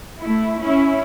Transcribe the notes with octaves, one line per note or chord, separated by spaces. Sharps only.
A3 E4
C#4 E4